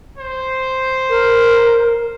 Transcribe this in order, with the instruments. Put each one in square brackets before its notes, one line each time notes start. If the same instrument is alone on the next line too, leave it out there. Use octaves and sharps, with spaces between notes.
[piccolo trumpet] C5
[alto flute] A#4